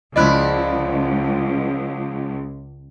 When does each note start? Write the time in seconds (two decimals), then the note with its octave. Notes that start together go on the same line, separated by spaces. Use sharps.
0.16 C#2 F3 E4 D5 D#5 F#6